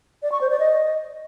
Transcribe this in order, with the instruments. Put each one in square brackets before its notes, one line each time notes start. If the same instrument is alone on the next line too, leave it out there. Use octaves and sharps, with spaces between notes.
[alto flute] D5
C#6
C5
D5
D#5